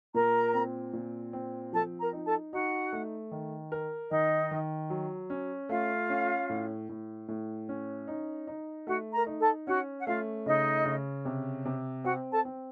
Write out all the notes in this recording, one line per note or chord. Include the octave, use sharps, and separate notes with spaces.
A#2 A#4 A#5
C4
A#2
C4
F3 A4 A5
A#4 A#5
D#4
A4 A5
D#4 F#4 F#5
A3
D#3
A#4
D#3 D#4 D#5
D#3
F#3
C#4
A3 F4 F5
C#4
A2
A2
A2
C#4
D#4
D#4
A3 F#4 F#5
A#4 A#5
D#4
A4 A5
C#4 F#4 F#5
F#5
A3 F4 F5
C#3 D#4 D#5
C#3
C3
C3
C4 F#4 F#5
A4 A5
C4